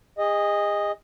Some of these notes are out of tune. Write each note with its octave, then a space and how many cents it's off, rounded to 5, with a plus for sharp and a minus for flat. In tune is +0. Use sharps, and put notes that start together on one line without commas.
G#4 -35 D#5 +0